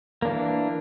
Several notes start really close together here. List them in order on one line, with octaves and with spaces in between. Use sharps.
A#3 D4 E3